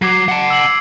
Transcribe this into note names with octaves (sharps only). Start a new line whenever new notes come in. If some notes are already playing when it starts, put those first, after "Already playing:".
F#3 D6 G#6 C7
F#5 A5
E6 F#7